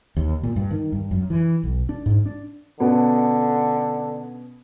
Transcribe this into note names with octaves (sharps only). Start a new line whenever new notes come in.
D#2
A#2
G2
D#3
G2
F#2
E3
B1
D4
G#2
D4
B2 D3 B3 C#4